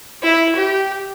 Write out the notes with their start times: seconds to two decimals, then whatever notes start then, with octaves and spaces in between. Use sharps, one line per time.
0.22 E4
0.55 G4